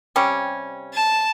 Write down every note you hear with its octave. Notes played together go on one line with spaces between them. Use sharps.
C3 G3 C#4
A5